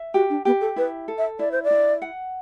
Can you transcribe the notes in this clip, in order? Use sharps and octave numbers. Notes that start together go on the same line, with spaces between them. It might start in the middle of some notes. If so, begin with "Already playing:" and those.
Already playing: E5
F#4 G4
D4
B3 G4
A4
E4 B4
A4
E5
E4 D5
C5
D5
E4
F#5